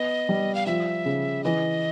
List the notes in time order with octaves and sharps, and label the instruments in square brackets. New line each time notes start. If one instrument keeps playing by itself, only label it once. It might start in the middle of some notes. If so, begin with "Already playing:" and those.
Already playing: [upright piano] B3 [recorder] D#5
[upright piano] G3
[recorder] F5
[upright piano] F3 [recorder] E5
[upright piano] C#3
[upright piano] E3 [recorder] D#5